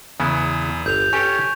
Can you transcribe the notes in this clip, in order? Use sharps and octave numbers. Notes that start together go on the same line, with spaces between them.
E2 C#3 B3 E4
G1 G6 F7
C#4 G4 A4 G#5 C#6